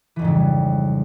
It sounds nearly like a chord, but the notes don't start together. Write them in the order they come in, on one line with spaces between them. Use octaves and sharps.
E3 F2 G#2 C#3 G3